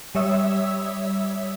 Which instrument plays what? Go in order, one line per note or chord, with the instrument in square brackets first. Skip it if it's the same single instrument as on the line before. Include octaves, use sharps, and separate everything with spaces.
[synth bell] G3 C#5 E5 D#6 E6